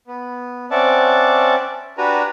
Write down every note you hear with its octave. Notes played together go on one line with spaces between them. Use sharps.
B3
C4 C#4 D5 E5 F#5 A5
D4 F#4 G4 B4 G#5 A#5